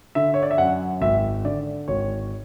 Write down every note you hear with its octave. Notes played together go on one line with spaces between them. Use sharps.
D3 E5
C#5
D5
E5
F#2 F#5
G#1 E5
D3 D5
G#1 C#5